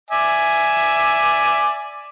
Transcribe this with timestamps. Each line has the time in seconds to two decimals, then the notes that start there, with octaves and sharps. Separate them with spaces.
0.11 D5 E5 G#5